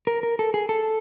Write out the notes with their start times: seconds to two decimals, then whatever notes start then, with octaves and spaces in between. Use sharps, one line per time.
0.07 A#4
0.23 A#4
0.39 A4
0.54 G#4
0.69 A4